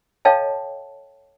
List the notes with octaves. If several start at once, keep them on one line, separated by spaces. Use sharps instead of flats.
A4 C#5 D#5 F5 G5 A5